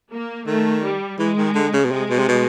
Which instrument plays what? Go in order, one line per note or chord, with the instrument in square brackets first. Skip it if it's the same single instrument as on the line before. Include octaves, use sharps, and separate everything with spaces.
[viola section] A#3
[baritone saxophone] D#3 [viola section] A3
[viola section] G3
[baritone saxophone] E3 [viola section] G#3
[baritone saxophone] D#3
D3
C#3
B2
[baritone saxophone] C3 [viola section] G#3
[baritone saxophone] B2
C3
B2